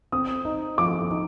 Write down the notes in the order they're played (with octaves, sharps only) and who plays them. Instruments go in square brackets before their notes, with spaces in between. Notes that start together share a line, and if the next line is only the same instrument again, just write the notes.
[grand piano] C4 [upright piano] D#6
[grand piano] D#4
[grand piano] F3 [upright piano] D6
[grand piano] D#4